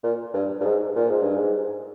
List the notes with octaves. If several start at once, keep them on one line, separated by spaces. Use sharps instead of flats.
A#2
G2
G2
G#2
A#2
G#2
G2
G#2